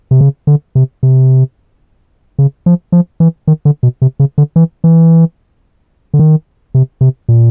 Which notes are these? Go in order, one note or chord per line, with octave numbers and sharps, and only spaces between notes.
C3
C#3
D3
C3
C3
C#3
F3
F3
E3
D#3
D3
B2
C3
C#3
D3
E3
E3
D3
D#3
C3
C3
A#2